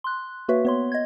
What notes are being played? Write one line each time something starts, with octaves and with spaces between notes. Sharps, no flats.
C6 F#6
A#3 F#4 B4 C#5 E5
B3 C#5 C6
D#5 G#6